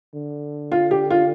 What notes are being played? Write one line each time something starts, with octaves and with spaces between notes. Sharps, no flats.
D3
F4
G4
F4